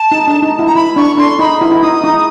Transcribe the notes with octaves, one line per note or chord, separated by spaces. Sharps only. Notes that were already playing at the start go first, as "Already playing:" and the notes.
Already playing: A5
D#4
D4
D#4
E4
A#5
E4 B5
D4 C#6
D4 C6
D#4 B5
E4
E4
D#4 D#6
D#4